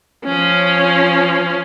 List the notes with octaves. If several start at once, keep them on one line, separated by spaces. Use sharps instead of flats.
F3 C#4